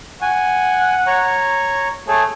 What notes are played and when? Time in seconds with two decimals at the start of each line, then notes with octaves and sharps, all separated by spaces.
0.22 F#5 G#5
1.07 C#5 A#5 C#6
2.08 A3 G#4 A4 C#5